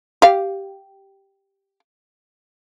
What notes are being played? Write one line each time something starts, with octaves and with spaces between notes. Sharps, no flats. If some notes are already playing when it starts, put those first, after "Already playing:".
G4 F5